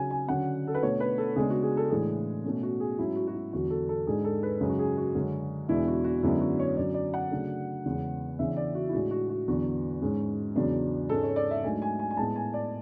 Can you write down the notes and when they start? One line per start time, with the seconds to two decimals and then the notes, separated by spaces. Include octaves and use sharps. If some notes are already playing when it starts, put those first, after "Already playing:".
Already playing: C#3 F#3 C#4 G#5
0.10 G#5
0.28 D3 F#3 C#4 F#5
0.67 A4
0.74 B4
0.83 B2 A3 D4 C#5
1.00 B4
1.18 A4
1.36 C#3 G#3 B3 D4 G#4
1.50 F#4
1.63 G#4
1.77 A4
1.90 A2 E3 G#3 D4 G#4
2.44 B2 A3 C#4
2.63 F#4
2.80 G#4
2.98 G#2 F#3 C#4 E4
3.16 F#4
3.27 F#4
3.34 E4
3.53 E2 D3 F#3 F#4
3.70 A4
3.89 A4
4.07 G#2 G#3 D4 G#4
4.24 A4
4.43 B4
4.61 F#2 C#3 G#3
4.69 F#4
4.79 G#4
4.97 F#4
5.15 F#2 D3 G#3 C#4
5.68 E2 B2 G#3 B3 D4 E4
5.87 F#4
6.04 F#4
6.22 F#2 D3 G#3 B3 D4 E4
6.41 F#4
6.59 C#5
6.77 F#2 D3 F#3 D5
6.94 D5
7.14 F#5
7.31 C#3 F#3 A3 D4
7.86 E2 C#3 G#3 B3
8.39 C#3 E3 B3 D4 E5
8.57 D5
8.75 F#4
8.89 E4
8.93 A2 G#3 D4 F#4
9.11 F#4
9.29 F#4
9.48 E2 D3 F#3 B3 D4 F#4
10.01 G#2 G#3 C#4
10.55 E2 C#3 F#3 B3 D4
11.09 G#2 G#3 C#4 A4
11.23 C#5
11.36 D5
11.51 E5
11.63 G#2 F#3 A3 D4 G#5
11.82 G#5
11.99 G#5
12.11 G#5
12.17 A2 G#3 B3 A5
12.36 G#5
12.54 D5